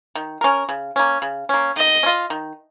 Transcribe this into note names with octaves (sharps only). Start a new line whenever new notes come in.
D#3
C#4 A#4
C#3
A#3 C#4
C#3
A#3 C#4
D#3 D#5
C#4
F4
D#3